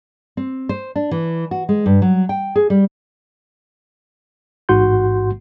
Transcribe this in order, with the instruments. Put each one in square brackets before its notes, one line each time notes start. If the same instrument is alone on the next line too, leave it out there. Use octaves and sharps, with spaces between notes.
[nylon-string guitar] C4
C5
D4
E3
F#4
G#3
G2
F#3
G5
G#4
G3
[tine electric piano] A1 G#2 F#4 F#5 C6 G6